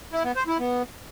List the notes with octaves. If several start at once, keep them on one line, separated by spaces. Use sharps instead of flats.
E4
B3
C5
E4
B3